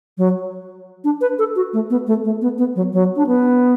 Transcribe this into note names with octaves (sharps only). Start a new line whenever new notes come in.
F#3
D4
B4
A4
F#4
A3
B3
A3
A3
B3
B3
F#3
F#3
D4
B3